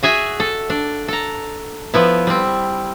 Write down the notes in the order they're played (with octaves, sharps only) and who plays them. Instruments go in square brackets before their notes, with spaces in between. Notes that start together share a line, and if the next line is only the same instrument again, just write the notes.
[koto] F#4 G#4 E5 G#5
A4
D4
A4 A#5
F3 B3 E4
G3 C4